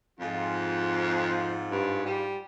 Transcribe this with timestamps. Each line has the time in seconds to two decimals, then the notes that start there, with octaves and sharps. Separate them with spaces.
0.20 F2 G#2 F4
1.71 G2
2.06 G3